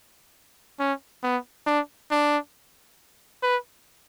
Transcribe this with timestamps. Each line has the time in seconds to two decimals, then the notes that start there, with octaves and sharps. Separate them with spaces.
0.79 C#4
1.23 B3
1.66 D4
2.11 D4
3.43 B4